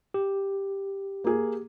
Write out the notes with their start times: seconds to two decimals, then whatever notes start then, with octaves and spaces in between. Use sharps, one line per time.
0.14 G4
1.24 A#3 G#4